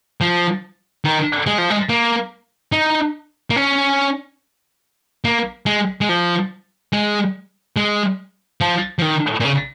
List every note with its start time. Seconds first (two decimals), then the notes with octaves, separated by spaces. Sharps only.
0.21 F3
1.04 D#3
1.47 G#3
1.58 F3
1.70 G#3
1.89 A#3
2.72 D#4
3.50 A#3
3.56 C#4
5.25 A#3
5.66 G#3
6.01 G#3
6.09 F3
6.93 G#3
7.76 G#3
8.61 F3
8.99 F3
9.02 D#3
9.40 A#2
9.45 C#3